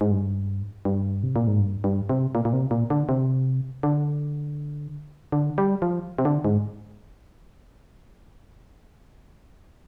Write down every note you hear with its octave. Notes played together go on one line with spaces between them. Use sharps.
G#2
G2
G2
C3
A#2
G#2
G2
G2
C3
A#2
A#2
C3
A#2
D3
C3
D3
D3
G3
F3
C3
D3
G#2